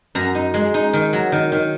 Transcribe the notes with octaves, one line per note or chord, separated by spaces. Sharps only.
F#2 A#5
D#4
G#3
D#4
D#3
F#3
D#3
D#3